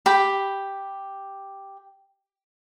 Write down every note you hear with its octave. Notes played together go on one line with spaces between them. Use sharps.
G4 B5